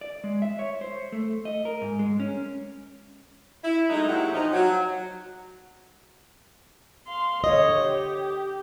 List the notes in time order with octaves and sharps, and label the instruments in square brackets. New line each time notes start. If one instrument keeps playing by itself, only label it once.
[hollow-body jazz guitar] D5
G#3
E5
C#5
C5
A3
D#5
A#4
G#2
G#3
C#4
[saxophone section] E4
F#3 G#3 A3 D#4
A#2 F#3 E4 F#4 G4 F#5
F3 D#4
F#3
[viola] F5 C6
[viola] D3 C#5 [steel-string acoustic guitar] D#5
[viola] G4